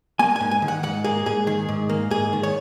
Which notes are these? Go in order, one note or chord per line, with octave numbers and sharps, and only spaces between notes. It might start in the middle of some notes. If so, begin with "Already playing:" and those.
A#3 G#5
G#2 G#5
G#5
D#3
F#5
G#2 F#5
A#3 G#4
G#2 G#4
D#3 G#4
G#2
A#3
G#2 G#4
D#3
C#5